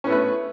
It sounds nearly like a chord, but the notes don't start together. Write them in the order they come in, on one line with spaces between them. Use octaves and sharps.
C#4 B3 A3 B4